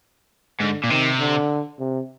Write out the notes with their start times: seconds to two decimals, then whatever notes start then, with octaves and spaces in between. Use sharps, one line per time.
0.60 G#2 D3
0.84 A#2
0.90 C3 D#3
1.20 D3
1.79 C3